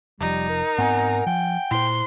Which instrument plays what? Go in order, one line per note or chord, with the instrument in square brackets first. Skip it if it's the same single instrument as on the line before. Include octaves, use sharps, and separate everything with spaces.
[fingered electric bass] F1 F3 [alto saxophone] G3 [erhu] D#4
[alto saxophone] A#4
[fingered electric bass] G#2 B3 C4 [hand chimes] F#5 G#5
[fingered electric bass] F3 [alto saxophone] G5
[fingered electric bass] A#2 [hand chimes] E4 C5 [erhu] C6